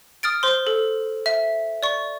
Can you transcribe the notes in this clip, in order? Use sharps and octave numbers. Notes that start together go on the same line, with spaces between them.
D#6 F6 A6 D7
C5 C6
A4
E5
D5 C#6